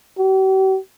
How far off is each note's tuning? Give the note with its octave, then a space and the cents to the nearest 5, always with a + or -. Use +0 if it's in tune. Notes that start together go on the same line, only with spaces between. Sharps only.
G4 -45